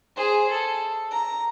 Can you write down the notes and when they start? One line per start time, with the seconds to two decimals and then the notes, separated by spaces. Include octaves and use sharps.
0.16 G#4 C5
0.51 A4
1.12 A#5